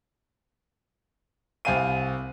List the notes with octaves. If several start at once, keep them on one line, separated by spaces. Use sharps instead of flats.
C2 C4 F5 G#5 D#7